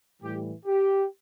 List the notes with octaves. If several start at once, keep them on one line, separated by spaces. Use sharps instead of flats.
A2 E3 G3 G4
G4